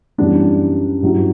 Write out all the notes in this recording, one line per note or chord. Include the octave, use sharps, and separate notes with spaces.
F#2 E3 G3 B3 D4
G2 F#3 C#4 E4